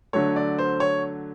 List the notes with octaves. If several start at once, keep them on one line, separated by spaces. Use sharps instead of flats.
D3 F#3 A3 C#5
D5
C5
C#5